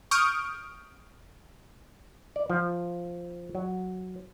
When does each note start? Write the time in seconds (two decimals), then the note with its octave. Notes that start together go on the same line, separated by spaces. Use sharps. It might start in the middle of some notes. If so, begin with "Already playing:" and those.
0.11 C#6 D#6 F6 G6 D7
2.36 D5
2.50 F3
3.55 F#3